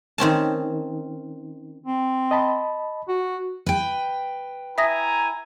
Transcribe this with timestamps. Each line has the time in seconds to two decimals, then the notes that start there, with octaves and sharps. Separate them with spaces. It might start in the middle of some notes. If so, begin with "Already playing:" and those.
0.18 D#3 C4 C#4 A5
1.86 C4
2.31 D#5 A5 B5
3.08 F#4
3.66 B4 G5
4.78 E4 E5 G#5 A#5 D#6 A#6